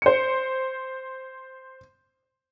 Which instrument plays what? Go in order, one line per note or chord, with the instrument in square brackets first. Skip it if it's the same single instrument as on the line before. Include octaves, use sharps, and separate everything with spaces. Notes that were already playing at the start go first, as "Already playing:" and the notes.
[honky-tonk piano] C5 C#7